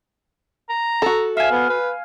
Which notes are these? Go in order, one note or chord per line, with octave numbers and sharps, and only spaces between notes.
A#5
F#4 A4
E5 F5 G#5
B3
B4